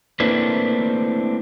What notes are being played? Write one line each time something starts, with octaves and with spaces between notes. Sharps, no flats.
A3 A#3 C4 D4 E4 B4